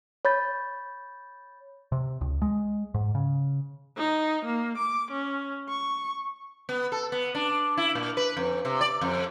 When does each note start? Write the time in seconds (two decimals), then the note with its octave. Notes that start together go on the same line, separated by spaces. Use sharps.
0.25 C#5 B5 G6 A6
1.92 C3
2.21 C#2
2.42 G#3
2.94 G#2
3.15 C#3
3.98 D#4
4.45 A#3
4.78 D6
5.12 C#4
5.69 C#6
6.69 B3
6.92 A4
7.12 B3
7.35 D4
7.77 E4
7.95 A#2
8.17 B4
8.37 F2
8.65 C3
8.81 D5
9.01 F2